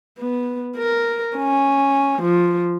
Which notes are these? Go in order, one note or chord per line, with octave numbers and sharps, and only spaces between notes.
B3
A#4
C#4
F3